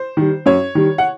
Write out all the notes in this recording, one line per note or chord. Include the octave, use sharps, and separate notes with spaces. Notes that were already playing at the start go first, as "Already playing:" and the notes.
Already playing: C5
D#3 G3
F#2 C#5
D#3 G3
F#5